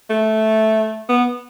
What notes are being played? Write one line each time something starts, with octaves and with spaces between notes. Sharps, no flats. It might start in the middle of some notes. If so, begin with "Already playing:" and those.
A3
B3